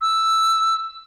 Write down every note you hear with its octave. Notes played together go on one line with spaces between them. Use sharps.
E6